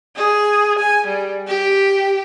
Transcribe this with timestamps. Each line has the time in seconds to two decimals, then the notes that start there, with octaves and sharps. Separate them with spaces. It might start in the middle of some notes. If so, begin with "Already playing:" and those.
0.16 G#4
0.78 G#5
1.07 G3
1.48 G4